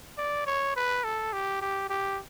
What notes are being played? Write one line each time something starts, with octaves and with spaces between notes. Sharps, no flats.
D5
C#5
B4
A4
G4
G4
G4